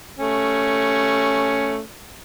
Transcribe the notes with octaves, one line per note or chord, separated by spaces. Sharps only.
A3 C#4